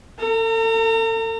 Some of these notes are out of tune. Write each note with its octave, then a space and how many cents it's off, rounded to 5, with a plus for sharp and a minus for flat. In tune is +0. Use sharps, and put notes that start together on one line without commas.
A4 +35 A#5 -35